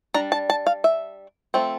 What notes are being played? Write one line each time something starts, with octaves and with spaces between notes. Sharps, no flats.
G3 D4 A#5
A5
A5
F5
E5
F3 A3 C4